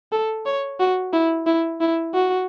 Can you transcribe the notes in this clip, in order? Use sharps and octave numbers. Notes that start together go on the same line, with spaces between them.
A4
C#5
F#4
E4
E4
E4
F#4